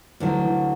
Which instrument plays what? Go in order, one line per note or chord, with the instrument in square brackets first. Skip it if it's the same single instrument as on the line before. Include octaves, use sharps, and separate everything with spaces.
[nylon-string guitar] D2 D3 F#3 [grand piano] E3
[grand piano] E3